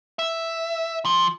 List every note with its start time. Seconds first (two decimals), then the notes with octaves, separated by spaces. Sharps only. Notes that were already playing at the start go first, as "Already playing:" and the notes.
0.19 E5
1.05 F3